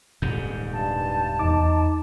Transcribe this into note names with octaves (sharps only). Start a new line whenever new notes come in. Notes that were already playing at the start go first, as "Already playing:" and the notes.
D#1 G#2 C3 G6
G2 A5
E2 D#4 D6